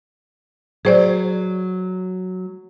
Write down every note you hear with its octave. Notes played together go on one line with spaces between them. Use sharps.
F#3 G#4 C5 D5